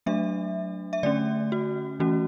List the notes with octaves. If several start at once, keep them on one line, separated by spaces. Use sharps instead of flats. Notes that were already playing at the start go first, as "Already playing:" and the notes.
F#3 A3 D4 E5
E5
D3 A3 C#4 D5
F#4
E3 A3 C#4 F#4